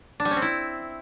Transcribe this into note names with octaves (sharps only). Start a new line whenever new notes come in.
D4
G3
C#4
C4
E4